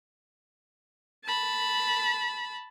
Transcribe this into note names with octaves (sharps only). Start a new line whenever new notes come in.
A5 B5